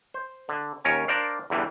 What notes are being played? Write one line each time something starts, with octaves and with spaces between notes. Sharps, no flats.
C5
D3
D#2 C#4 A#4 C#5 G#5
D4 A#4 C5 D5 F5
E2 D3 E3 G3